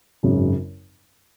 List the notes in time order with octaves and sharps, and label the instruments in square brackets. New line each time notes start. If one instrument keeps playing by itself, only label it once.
[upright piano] G#1 F#2 C#3